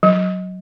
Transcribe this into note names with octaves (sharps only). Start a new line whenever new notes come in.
F#3